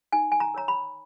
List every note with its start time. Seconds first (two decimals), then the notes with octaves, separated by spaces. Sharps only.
0.12 D#4 G#5
0.32 G#5
0.40 A#5
0.54 A#4 C#5 A#5
0.68 B5